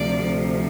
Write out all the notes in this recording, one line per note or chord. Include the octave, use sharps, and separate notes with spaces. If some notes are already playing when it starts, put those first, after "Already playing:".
Already playing: D2 C3 F3 D5